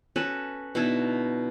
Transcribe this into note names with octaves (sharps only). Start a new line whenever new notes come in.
C#4 F#4 A4 B4
B2 D3 D#4 E4